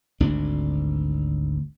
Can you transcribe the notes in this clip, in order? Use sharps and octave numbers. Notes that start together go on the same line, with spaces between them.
G#1 D2 D4